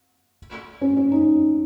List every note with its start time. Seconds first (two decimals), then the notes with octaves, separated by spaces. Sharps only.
0.81 C#4
0.97 C#4
1.12 D#4